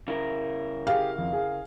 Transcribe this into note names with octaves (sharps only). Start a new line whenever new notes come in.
C#3 E4 A#4
G4 G#4 F5
F2
G#4